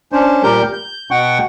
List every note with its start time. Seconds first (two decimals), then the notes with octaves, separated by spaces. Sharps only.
0.12 C#4 D4 C5
0.43 A#2 G3 G4 A#4 G6
0.73 G6
1.11 B2 F#5 G5 C#6